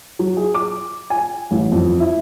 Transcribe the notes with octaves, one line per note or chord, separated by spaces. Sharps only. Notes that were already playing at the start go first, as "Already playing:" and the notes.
F#3
G#4
D6
G#5
A1
F2
E4